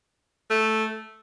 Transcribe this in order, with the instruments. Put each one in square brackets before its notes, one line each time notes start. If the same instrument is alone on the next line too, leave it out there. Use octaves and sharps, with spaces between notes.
[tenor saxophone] A3